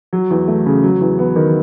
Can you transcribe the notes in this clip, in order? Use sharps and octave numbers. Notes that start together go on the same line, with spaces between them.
F#3
E2
A3
C#3
F#3
E2
B3
D#3